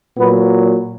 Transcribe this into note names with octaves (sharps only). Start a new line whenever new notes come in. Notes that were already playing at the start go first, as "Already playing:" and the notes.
A#2 F#3 B3